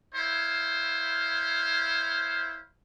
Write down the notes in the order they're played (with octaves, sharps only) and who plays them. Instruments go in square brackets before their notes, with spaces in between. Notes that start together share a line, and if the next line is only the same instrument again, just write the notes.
[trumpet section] E4 C5 C#5 F5